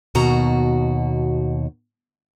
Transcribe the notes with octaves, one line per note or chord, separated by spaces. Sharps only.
D#2 B2 F#4 A#5